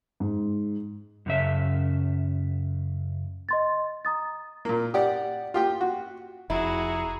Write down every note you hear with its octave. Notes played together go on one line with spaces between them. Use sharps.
G#2
F#2 C#3 E5
D#5 C6 A6
A#5 D#6 A6
A#2 A#3
G4 D5 F#5
F4 G4 G5
F#4
F1 E4 F#4 G#4 A#5